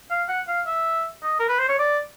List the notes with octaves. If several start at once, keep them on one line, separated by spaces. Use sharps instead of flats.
F5
F#5
F5
E5
D#5
A#4
B4
C5
C#5
D5